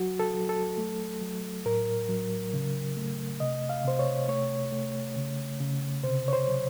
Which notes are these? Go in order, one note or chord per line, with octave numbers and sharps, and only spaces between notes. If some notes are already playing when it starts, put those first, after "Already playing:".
Already playing: F#3 F#4
A4
F#3
A4
A3
F#3
A2 A#4
F#3
C#3
A3
C3 D#5
F5
C3 C5
C#5
A3 C#5
A3
C#3
C#3
C3 C5
C#5
C5
F#3